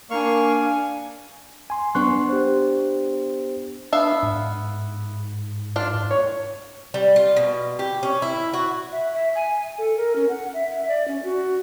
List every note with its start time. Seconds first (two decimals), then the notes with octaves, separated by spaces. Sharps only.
0.10 A#3 D4 F5 G#5 C#6
1.70 G#5 C6
1.95 B3 D4 C6 C#6 F#6
2.29 G4 C5
3.93 B3 D4 E5 F5
4.23 G#2
5.76 D4 F4
6.11 C#5
6.94 G3
7.16 F4
7.37 B2
7.79 G4
8.03 C#4
8.22 E4
8.54 F#4
8.92 E5
9.14 E5
9.35 G#5
9.78 A4
9.97 A#4
10.16 C#4
10.29 F#5
10.54 E5
10.70 E5
10.88 D5
11.08 C#4
11.24 F#4